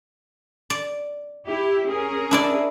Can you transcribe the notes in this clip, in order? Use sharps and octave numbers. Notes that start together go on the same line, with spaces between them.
D5
E4 G4
C#4 G#4 A#4
D4 E4 D5